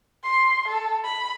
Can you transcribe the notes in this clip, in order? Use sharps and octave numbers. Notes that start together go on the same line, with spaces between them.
C6
A4
B5